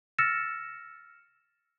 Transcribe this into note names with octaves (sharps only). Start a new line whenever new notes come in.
E6 F6 A6 A#6 C#7 E7